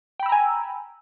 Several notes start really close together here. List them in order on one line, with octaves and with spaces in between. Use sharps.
G5 B5 E6 A#5 G#5